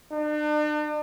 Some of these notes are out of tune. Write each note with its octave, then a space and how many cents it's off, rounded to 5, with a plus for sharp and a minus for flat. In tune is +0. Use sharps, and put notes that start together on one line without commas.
D4 +45